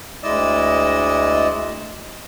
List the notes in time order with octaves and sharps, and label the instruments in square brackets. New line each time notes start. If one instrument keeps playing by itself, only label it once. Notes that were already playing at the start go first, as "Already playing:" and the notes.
[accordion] D2 G#3 D#5 [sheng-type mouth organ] E4 D5 E6